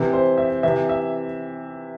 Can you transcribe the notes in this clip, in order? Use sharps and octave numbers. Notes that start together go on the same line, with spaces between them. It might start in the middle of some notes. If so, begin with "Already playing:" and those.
Already playing: C3 E3
C5
E5
C3 E3 E5
E5